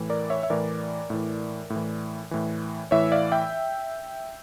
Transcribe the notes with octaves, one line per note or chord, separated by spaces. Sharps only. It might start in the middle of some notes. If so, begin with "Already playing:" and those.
Already playing: A2 E3
A#4 D5
C#5 E5
E5
A2 E3 A#4 D5
A2 E3
A2
E3
A2 E3
A2 E3 C#5 E5
D5 F5
E5 G5